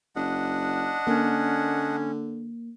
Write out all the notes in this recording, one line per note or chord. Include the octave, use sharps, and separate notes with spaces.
F#1 D4 D#5 F#5
D3 A#3 C#4